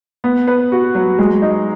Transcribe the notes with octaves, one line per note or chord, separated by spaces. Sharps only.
B3
B4
F#4
F#3
G#3
D#4